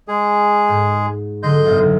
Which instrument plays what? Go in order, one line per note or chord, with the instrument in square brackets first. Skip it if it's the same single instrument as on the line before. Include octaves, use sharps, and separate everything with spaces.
[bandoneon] G#3 G#4
[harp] G#2
[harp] D3 F#3 [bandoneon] D#5 C6 G6
[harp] B1 F#2